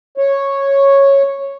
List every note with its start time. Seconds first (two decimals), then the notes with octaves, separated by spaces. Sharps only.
0.18 C#5